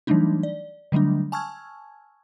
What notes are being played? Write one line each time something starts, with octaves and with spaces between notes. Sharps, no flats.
E3 F#3 G3 A3 D4 D#4
D5
D3 F#3 G3 A3 D4
G#5 A5 C#6 E6 F6 G#6